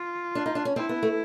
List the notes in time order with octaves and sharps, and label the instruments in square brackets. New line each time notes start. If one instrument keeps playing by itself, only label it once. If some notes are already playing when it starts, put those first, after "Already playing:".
Already playing: [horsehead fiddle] F4
[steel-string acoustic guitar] D4
D#4
D4
C#4
[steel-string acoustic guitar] C4 [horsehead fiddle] E4
[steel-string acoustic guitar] B3
A3